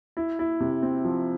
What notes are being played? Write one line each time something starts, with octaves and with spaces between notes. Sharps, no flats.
E4
E4
C3
C4
F3